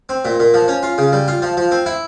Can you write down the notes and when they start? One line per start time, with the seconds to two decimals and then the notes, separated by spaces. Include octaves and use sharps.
0.09 C4
0.25 A#2
0.40 A#2
0.54 F3
0.68 C#4
0.83 F4
0.98 C#3
1.12 G3
1.28 F4
1.42 F3
1.57 F3
1.71 C4
1.86 E4